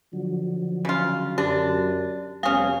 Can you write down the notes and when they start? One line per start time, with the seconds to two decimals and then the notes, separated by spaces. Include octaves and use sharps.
0.13 D3 F3 F#3
0.85 C#3 F4
1.38 F#2 D4 G4
2.43 F1 G3 B3 C#4 G4 G#4 F5